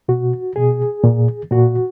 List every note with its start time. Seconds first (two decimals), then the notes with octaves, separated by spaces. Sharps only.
0.08 B2 F#4
0.56 B2 G#4
1.04 A#2
1.51 A#2 F#4